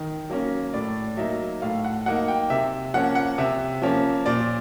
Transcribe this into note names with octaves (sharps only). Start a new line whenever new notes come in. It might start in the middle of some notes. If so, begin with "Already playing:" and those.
Already playing: D#3
F#3 A#3 C#4
A2 D5
F#3 A#3 D#4 E5
A2 F5
F#5
F#3 A#3 D#4 F#5
G5
C3 E5
F3 A#3 C#4 F#5
F#5
C3 E5
F3 A#3 C#4
A#2 D5